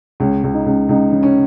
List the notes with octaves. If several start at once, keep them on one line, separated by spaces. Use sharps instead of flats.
C#2 C#4
C#2
D#4
C#2
C#2 D#4
C#3
C#4